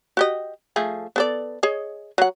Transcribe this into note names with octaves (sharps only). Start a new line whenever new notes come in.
F#4 G4 D#5
F3 A3 G#4
B3 A4 D5
G#4 C#5 D#5
F#3 F#5